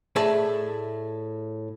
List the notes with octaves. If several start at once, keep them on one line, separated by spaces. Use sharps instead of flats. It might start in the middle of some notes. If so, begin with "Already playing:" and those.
A2 G#4 D5 E5 A5